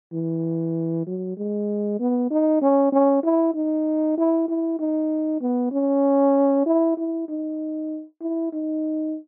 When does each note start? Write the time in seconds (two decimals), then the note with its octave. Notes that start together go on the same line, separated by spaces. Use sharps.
0.13 E3
1.07 F#3
1.37 G#3
2.00 B3
2.30 D#4
2.62 C#4
2.92 C#4
3.23 E4
3.54 D#4
4.18 E4
4.48 E4
4.79 D#4
5.41 B3
5.72 C#4
6.66 E4
6.97 E4
7.28 D#4
8.21 E4
8.52 D#4